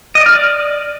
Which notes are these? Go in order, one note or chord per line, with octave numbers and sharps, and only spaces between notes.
D#5
D5
F6
D5